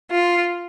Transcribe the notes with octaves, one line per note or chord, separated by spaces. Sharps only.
F4